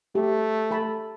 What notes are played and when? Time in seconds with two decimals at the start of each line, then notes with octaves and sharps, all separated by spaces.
0.15 A3 G4
0.71 A4 A5 B5